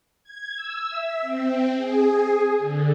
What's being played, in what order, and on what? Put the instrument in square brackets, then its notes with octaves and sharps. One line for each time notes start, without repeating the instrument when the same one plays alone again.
[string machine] G#6
E6
E5
C4
G#4
G#4
D3